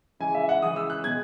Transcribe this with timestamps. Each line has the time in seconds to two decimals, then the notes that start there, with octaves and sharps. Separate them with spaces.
0.20 C#3 E3 G#3 G#5
0.34 E5
0.49 F#5
0.62 C#3 E3 G#3 D#6
0.76 E6
0.90 F#6
1.04 B2 G#3 G#6